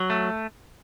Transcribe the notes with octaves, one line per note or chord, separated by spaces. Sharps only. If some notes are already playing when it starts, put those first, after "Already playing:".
Already playing: F#3
A3